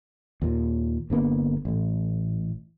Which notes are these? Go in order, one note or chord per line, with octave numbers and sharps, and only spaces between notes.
D#2 A#2
G1 D3 A#3 B3
A1 A2